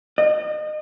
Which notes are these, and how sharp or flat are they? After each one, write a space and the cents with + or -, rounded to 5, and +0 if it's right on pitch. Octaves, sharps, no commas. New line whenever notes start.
D#5 -30